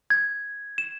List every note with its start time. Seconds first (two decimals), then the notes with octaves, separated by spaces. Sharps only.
0.10 G#6
0.78 E7